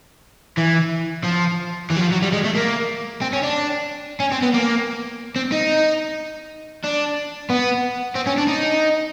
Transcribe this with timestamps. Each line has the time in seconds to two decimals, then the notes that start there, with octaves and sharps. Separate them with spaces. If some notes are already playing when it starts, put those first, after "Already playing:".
0.58 E3
1.24 F3
1.90 E3
1.96 F#3
2.01 F3
2.12 F#3
2.22 G3
2.33 G#3
2.45 A3
2.55 A#3
3.21 C4
3.33 C#4
3.43 D4
4.20 C#4
4.32 C4
4.42 B3
4.54 A#3
5.36 C4
5.52 D#4
6.84 D4
7.50 B3
8.16 C4
8.27 C#4
8.38 D4
8.48 D#4